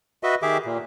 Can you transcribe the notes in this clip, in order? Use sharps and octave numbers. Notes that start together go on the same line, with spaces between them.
F#4 B4 D#5 E5
D#3 G4 G#4 E5 D6
A#2